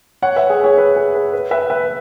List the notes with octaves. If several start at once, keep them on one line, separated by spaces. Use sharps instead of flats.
C#5 F#5
B4 E5
G#4 C#5
G#4 C#5
B4
G#4
B4
B4
B4 E5
B4 E5